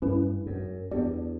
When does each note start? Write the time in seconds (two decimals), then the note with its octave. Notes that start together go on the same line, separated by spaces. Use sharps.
0.02 G2 C#4 E4 B4
0.46 F#2
0.91 E2 B3 D4 G4 D5